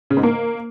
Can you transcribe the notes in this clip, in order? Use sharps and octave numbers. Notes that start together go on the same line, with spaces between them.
C#3
G#2
A#3